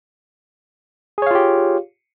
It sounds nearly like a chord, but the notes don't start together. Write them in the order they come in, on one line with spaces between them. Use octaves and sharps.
G#4 C#5 F5 F4 G4